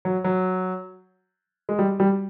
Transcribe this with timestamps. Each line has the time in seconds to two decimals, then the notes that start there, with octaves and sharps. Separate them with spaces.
0.05 F#3
0.24 F#3
1.69 G#3
1.79 G3
2.00 G3